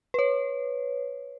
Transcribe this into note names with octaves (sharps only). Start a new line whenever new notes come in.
B4 C#5